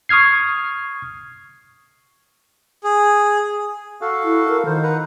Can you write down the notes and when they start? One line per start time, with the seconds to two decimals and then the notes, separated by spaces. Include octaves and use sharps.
0.09 C#6 D#6 F6 G#6 C7
2.84 G#4
4.01 F#4 A4 F5
4.24 E4
4.49 A#4
4.66 D#3 D#4 C5
4.83 B4 F#5 A#5